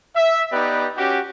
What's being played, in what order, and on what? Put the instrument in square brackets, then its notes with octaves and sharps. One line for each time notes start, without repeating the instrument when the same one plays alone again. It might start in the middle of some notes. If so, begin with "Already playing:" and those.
[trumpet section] E5
B3 D#4 G4 B4 D5
C#4 F#4 G4